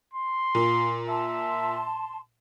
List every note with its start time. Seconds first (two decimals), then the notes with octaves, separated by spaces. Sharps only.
0.13 C6
0.55 A#2 F4
1.09 E5 A5 C6